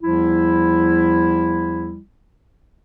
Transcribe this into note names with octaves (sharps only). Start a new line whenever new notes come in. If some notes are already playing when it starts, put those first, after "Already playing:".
E2 F3 G3 E4